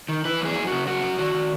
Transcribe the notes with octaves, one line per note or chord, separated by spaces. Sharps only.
D#3
E3 B4
F#2 G#4
F#2
C#3 F#4
F#2 F#4
F#2
D#3 F#4
D#3